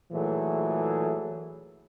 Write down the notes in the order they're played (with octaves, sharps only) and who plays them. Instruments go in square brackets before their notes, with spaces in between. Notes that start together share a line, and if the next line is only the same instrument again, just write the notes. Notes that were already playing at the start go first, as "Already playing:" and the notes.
[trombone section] A#2 E3 F#3 A3 G#4